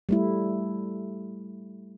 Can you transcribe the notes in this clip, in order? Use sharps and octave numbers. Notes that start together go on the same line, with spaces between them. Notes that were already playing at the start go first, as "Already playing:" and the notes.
G3 A3 E4